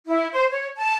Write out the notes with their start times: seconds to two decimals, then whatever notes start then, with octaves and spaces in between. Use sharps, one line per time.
0.07 E4
0.32 C5
0.50 C#5
0.75 A5